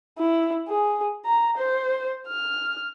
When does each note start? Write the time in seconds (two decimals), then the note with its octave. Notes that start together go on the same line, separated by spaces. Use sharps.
0.18 E4
0.68 G#4
1.25 A#5
1.57 C5
2.28 F6